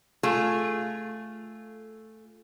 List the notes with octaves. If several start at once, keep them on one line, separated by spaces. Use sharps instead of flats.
A3 F4 G#4